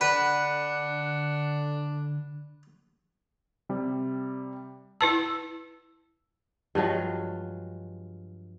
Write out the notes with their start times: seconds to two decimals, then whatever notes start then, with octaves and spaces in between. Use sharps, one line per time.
0.01 D3 D4 B4 F#5
3.69 C3 G3
5.01 E4 B4 A5 E6
6.75 G2 F3 F#3 G#3